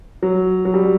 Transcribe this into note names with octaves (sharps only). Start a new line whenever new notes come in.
F#3
F#3
G3